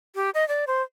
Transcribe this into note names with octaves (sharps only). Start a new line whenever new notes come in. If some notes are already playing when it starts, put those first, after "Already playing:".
G4
D#5
D5
C5